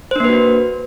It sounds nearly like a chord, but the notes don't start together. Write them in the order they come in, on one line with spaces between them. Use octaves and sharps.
C5 D4 A#3 B4 F#4